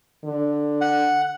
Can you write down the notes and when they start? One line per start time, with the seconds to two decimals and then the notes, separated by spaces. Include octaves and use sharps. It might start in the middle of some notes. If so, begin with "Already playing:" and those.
0.24 D3
0.81 F#5